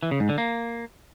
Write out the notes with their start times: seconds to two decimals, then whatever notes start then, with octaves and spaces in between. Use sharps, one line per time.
0.03 E3
0.11 C#3
0.20 G#2
0.29 D3
0.38 A#3